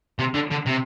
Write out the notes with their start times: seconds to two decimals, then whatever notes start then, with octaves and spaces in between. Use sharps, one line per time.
0.19 C3
0.34 D3
0.51 D3
0.67 C3